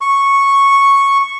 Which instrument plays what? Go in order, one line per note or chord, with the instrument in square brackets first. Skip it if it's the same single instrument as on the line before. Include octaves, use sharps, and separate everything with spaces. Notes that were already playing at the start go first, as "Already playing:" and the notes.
[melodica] C#6